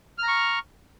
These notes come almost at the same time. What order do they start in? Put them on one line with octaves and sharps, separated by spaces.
F6 A#5 C#6